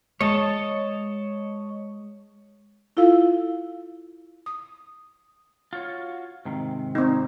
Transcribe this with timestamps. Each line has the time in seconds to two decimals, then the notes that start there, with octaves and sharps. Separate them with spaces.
0.21 G#3 C#5 D#5 A5
2.97 E4 F4 A4 F5 E6
4.46 D#6
5.73 F4 F#4 C#5
6.45 G#2 C3 D#3
6.95 C4 D#4